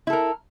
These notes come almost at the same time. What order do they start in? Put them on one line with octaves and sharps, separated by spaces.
E4 A4 A#4